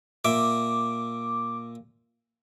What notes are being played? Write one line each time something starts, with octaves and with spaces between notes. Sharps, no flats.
A#2 E5 D6